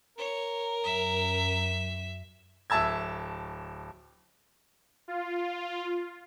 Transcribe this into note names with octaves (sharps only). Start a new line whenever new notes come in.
A#4 C#5
F#2 E5
D1 E5 A5 E6 G#6
F4